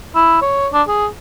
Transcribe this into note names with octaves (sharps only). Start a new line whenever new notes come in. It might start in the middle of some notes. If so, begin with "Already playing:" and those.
E4
C#5
D4
G#4